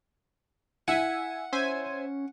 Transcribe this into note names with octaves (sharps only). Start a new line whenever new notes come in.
E4 E5 F#5 G#5
C#4 C5 E5 G#5